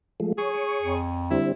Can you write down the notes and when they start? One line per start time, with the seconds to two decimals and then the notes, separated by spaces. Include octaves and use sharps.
0.20 F3 G#3 A3
0.38 G#4 C#5
0.82 F2
1.31 D3 G3 C4 E4